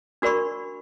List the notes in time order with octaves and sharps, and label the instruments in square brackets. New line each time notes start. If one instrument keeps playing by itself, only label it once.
[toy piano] D4 F#4 A#4 D5 B5 C#6